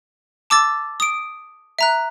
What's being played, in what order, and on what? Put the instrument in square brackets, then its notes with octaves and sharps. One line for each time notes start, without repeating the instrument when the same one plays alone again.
[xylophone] A5 D6 E6 A6
D#6 D7
E5 A#5 F#6